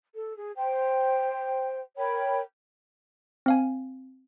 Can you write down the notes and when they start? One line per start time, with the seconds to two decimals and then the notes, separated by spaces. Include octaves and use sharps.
0.15 A4
0.37 G#4
0.56 C5 G5
1.97 A#4 C#5 G5 B5
3.46 C4 F5 G#5